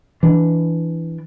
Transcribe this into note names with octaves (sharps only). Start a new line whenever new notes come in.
E3 D4